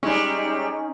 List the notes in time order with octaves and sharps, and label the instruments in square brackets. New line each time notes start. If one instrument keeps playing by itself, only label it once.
[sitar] G3 G#3 [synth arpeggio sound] C#4 D#4